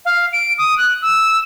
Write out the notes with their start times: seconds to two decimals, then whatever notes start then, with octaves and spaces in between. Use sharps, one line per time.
0.05 F5
0.33 D7
0.58 D#6
0.78 F#6
1.02 E6